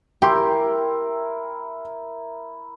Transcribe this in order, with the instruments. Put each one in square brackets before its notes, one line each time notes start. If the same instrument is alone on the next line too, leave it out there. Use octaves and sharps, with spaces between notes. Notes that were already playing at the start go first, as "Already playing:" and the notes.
[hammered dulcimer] E4 A#4 [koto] G4 [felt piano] G5 C6